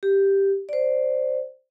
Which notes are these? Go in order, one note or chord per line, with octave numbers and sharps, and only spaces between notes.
G4
C5 D5